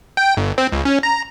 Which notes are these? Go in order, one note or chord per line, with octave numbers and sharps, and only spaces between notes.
G5
G1
C4
C#2
C#4
A#5